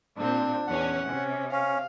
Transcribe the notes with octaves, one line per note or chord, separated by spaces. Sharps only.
A#2 C4 D4
E2 C#4 F#5
C3 C#4
C#4 F5